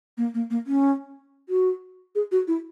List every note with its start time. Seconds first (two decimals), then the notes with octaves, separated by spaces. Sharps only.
0.17 A#3
0.34 A#3
0.50 A#3
0.67 C#4
1.49 F#4
2.15 G#4
2.32 F#4
2.48 E4